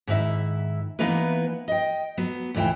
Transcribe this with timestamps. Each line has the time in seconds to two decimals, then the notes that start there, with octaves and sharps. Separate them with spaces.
0.07 G#2 D#3 E4 E5
0.99 E3 A#3 B3 D#4 E4 B4
1.68 D#5 G5
2.17 F#3 B3
2.55 D2 A#2 E3 E4 G5